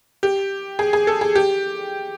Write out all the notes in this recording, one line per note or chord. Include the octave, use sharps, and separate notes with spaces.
G4
G#4
G#4
A4
G#4
G4